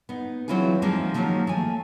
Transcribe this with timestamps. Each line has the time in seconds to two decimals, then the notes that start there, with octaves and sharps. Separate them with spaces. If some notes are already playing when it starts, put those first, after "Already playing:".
0.09 B3 D#4
0.48 E3 F#3 C4 E4 F4 G#4
0.82 D#3 F3 G3 G#3 A#3 C4
1.14 D#3 F3 F#3 A3 A#3 C#4
1.47 A3 G#5